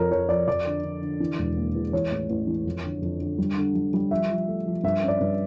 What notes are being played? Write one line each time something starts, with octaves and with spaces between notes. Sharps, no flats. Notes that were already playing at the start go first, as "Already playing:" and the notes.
Already playing: F2 F3 A#4 C#5
F3 C#5
F3 D5
F2 D5
D3
D3
D3
E3
E1
A#3
E2
E3 C#5
A1
A1
E3
F2
D3
F2
D3
G3
D3
G3
G3
F3 E5
F3
A3
F3
G2 E5
C#4
D5
G2